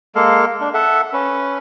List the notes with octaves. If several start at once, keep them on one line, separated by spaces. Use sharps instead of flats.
G#3 A#3 A4 F5
D4
A4 E5 F#5
C#4 B4